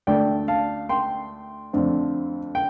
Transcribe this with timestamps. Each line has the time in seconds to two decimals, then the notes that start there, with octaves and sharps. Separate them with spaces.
0.07 D2 D3 A3 D5 G5
0.48 F5 A5
0.89 G5 C6
1.73 F2 D3 A3 C4
2.55 G5